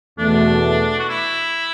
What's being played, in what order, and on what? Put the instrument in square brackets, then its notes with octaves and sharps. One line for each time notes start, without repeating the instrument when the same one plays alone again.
[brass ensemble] E2 B2 A3 [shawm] D4
[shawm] F#4
E4